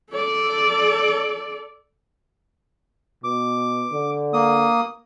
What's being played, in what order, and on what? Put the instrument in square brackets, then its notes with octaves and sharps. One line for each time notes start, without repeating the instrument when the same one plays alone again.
[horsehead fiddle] A4 D5
[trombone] B2 [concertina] D6
[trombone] D3
[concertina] A#3 D#6